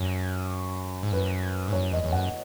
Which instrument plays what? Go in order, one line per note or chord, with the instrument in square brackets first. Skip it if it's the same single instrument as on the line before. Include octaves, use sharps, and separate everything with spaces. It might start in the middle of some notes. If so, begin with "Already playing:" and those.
Already playing: [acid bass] F#2
G#2
[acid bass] F#2 [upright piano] B4
[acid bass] G#2
[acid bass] F#2 [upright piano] C#5
[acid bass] E2 [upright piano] D#5
[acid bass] E2
[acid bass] F#2 [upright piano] F#5